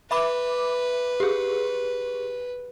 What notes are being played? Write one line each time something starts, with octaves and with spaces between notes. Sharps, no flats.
B4 E5 B5 D6
G4 G#4